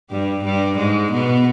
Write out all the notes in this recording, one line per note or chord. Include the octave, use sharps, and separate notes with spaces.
G2 G3
G2 G3
G#2 G#3
B2 B3